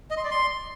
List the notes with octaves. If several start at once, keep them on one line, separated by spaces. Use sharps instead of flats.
D#5
C6
D5
C6